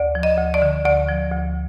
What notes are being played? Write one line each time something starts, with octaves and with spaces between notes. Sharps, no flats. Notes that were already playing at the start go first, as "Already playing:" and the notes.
Already playing: D2 D5
F3
D#5
D2
D5
D3
D2 D5
F3
D2